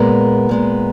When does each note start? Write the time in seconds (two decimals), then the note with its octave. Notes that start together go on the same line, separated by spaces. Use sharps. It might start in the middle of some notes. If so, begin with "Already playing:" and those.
Already playing: A#2 G#3 B3 A#4
0.49 A#2 G#3 B3